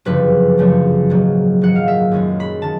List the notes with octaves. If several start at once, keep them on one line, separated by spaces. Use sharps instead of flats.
G1 F#2 C#3 F3 A3 B4
G1 F#2 C#3 F3 A3
A#1 G#2 D#3 F#3
A#1 G#2 D#3 F#3 F#5
F5
E5
F#2 D#3 G#3 C#4
B5
D#3 A5